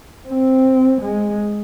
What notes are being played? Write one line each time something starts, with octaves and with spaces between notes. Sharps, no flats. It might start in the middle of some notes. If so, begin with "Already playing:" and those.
C4
G#3